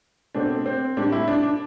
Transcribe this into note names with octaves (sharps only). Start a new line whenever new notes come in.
B2 A3 C4 D4
C4
A2 G3 C4 D4
E4
D4
D4